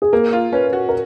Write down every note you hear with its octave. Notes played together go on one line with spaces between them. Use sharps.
G#4
A#3 A#4
F4
C#4 B4
F#4
A#4